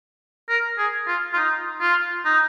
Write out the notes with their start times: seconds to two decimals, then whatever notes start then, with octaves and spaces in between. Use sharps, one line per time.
0.49 A#4
0.78 G#4
1.07 F4
1.33 F4
1.37 D#4
1.81 F4
2.25 D#4